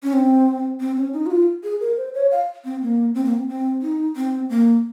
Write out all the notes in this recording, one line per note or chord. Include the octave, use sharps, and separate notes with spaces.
C#4
C4
C4
C#4
D#4
F#4
F4
G#4
A#4
C5
C#5
F5
C4
A#3
C4
A#3
C4
C4
D#4
C4
A#3